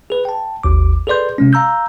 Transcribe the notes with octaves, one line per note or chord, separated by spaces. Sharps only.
G#4 B4
G5 A5
G#1 D#2 D6
G#4 A4 B4 D5 C6 G6
C3 G#3 C#4
F5 A#5 E6 G6